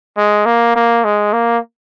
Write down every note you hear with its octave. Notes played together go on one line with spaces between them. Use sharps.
G#3
A#3
A#3
G#3
A#3